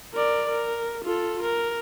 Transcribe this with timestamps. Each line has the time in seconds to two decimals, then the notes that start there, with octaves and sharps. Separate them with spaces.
0.14 A#4 D5
0.50 A#4
1.05 F4 A4
1.42 A#4